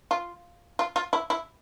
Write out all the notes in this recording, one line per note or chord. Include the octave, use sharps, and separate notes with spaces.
F4
F4
F4
E4
E4